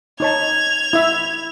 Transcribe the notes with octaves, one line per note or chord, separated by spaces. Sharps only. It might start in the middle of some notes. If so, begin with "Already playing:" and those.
D#4 C#5 A5 G#6 F7
E4 E5